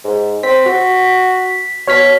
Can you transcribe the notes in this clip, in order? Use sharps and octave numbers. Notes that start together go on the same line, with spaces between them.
G#2
C4 B6
F#4
B2 C#5 F6 B6